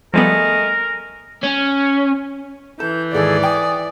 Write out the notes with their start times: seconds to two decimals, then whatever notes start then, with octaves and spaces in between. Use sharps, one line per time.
0.14 F3 G3 A3 B3 G#4 A#4 D#5
1.43 C#4
2.80 E3 A4 G6
3.13 D#2 G#2 D#3 G#4 A4 D5
3.44 G5 G#5 D#6